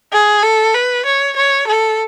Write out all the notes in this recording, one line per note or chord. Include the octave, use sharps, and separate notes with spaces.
G#4
A4
B4
C#5
C#5
A4